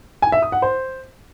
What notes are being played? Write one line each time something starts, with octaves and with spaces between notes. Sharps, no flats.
G#5
E5
D#6
F#5
C5